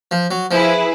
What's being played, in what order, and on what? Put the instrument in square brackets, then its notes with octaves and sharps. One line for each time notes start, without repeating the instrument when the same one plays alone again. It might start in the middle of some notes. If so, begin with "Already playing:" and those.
[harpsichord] F3
F#3
[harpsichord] F3 [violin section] E4 G#4 B4